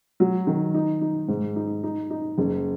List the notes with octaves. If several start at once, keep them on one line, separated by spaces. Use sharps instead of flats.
F#3
D#3
D#4
D#4
G#2
D#4
D#4
D#4
F#1